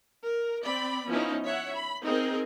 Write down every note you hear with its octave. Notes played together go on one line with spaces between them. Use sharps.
A#4
C4 D5 B5
F3 B3 C#4 D#4 E4
C#5 E5 F#5
B5
C4 D#4 G#4 A#4